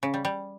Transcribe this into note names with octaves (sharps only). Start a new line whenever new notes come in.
C#3
G3
G3